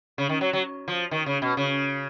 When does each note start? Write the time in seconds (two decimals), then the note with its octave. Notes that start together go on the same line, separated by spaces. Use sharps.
0.18 C#3
0.29 D#3
0.41 F#3
0.53 F#3
0.88 F3
1.11 D#3
1.26 C#3
1.42 B2
1.57 C#3